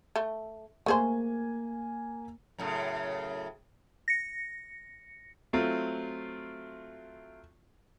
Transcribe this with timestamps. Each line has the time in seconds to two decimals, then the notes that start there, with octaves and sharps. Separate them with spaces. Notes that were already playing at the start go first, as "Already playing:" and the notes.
0.16 A3
0.86 A3 A#3 G#4 C5 G#5
2.58 F#2 A2 C#3
4.08 A#6 C#7
5.53 F#3 A3 C4 F4